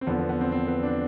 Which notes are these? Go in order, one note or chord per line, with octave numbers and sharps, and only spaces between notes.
C4
E2 D3 F3 B3
B3
B3
C4
C4
B3
D4